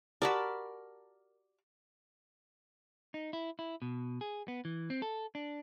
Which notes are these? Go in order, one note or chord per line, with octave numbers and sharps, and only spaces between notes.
F#4 G4 A#4 D5 A5 B5
D#4
E4
E4
B2
G#4
B3
E3
C4
A4
D4